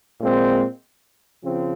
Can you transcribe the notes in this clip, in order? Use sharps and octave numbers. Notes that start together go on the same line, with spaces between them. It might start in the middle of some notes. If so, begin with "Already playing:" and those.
A#2 G#3 C4
C#3 F3 C4